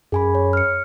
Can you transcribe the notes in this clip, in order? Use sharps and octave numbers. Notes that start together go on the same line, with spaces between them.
F#2 G#4 G#5 B5
C#5
F6 C#7